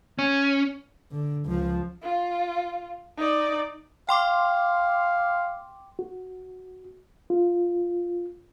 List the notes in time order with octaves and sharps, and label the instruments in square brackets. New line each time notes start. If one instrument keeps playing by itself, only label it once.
[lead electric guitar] C#4
[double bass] D3
C#2 F3
[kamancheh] F4
D#4 D5
[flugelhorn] F5 [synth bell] G5 C6 D6
[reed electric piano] F#4
F4